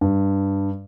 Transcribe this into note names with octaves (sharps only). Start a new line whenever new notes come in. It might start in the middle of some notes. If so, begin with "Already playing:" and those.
G2